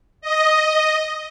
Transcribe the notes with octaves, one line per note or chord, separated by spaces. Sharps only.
D#5